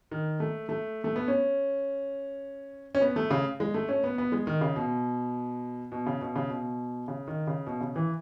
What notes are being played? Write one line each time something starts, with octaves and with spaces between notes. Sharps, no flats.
D#3
A3
A3
A3
B3
C#4
C#4
B3
A3
C#3
G#3
A3
C#4
B3
B3
G#3
D#3
C#3
B2
B2
C#3
B2
C#3
B2
C#3
D#3
C#3
B2
C#3
E3